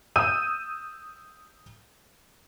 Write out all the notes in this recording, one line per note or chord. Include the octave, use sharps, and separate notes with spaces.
D#6 E6 G6 D#7